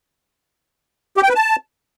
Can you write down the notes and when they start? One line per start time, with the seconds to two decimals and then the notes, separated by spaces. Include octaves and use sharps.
1.17 G4
1.23 G5
1.29 B4
1.35 A5